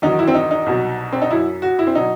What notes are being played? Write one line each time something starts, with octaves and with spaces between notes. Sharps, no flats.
E2 D#3 F#3 D#4
E4
C4
D#4
D#4
C2 B2 F#3
C4
D#4
F#2 F#3 E4
F#4
E4
C4
B2 F#3 D#4